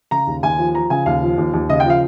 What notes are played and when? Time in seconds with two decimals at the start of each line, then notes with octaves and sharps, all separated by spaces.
0.11 C#3 A#5
0.27 D#2
0.43 D#2 G#5
0.58 F3
0.74 F3 A#5
0.90 C#3 G#5
1.06 D#2 F5
1.22 F3
1.38 D#2
1.53 D#2
1.69 C#3 D#5
1.80 G5
1.84 F3
1.90 F5